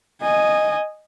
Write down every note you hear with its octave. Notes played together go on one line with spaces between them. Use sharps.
D#5 G#5